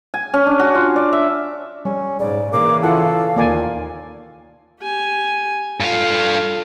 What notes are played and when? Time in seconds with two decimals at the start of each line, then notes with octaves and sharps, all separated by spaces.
0.14 G#5
0.34 C#4
0.46 D4
0.59 F#4
0.75 F4
0.96 D5
1.13 E5
1.85 G3 C#4
2.20 G#2 C#3 D5
2.52 C#3 E3 A#3 D6
2.83 E4 F4 A4 F5 F#5
3.36 D#2 A#2 D#3 A#3 D5 G#5
4.81 G4 G#5
5.80 G2 F4 A4 F5